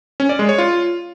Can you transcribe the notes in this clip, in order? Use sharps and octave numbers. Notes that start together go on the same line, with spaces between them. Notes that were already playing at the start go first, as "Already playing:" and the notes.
C#4
D5
G#3
C#5
F4